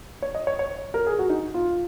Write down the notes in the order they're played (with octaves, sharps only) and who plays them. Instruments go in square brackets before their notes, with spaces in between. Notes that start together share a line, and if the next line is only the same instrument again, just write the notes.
[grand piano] C#5
D#5
C#5
C#5
A#4
G#4
F#4
D#4
F4